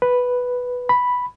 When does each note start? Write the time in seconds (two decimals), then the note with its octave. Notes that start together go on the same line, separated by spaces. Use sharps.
0.02 B4
0.89 B5